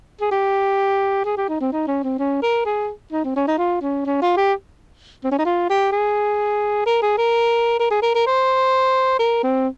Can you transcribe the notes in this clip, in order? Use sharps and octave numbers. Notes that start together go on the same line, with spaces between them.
G#4
G4
G#4
G4
D#4
C4
D#4
C#4
C4
C#4
A#4
G#4
D#4
C4
C#4
D#4
F4
C#4
C#4
F4
G4
C4
C#4
D#4
F4
G4
G#4
A#4
G#4
A#4
A#4
G#4
A#4
A#4
C5
A#4
C4